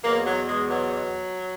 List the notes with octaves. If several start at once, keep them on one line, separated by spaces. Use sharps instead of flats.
E2 B2 F#3 A#3
F#3
G#3
F#3